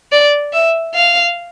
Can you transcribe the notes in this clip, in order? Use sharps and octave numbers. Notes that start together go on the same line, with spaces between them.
D5
E5
F5